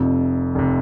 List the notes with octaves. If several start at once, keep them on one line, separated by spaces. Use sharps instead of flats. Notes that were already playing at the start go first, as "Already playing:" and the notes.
Already playing: F1 F2 C3
F1 C3